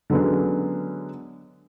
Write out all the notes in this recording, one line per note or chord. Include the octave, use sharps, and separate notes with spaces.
D3 F#3 G#3 B3 C#4